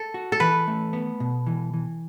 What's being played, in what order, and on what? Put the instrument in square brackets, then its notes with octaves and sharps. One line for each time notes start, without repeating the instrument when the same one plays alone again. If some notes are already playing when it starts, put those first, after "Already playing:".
Already playing: [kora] A4
[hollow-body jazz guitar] F#4
[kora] A4
[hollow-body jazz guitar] E3 [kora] B4
[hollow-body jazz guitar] A3
B3
B2
E3
E3